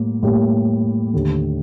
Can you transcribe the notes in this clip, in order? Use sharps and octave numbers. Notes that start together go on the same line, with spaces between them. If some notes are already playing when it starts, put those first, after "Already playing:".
Already playing: A2 G3 A#3
A2 G3 A#3
D#2 D3 A3